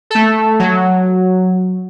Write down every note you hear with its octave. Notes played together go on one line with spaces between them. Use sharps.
A3 A4
F#3